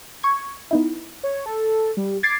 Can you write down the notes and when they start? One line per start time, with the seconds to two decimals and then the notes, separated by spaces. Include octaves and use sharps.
0.23 C#6 G#6
0.71 B3 D#4 E4
1.23 C#5
1.46 A4
1.97 G3
2.23 D6 G#6 A6 C7